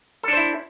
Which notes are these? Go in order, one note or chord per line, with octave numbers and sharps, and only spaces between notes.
D4 E4 A4 C5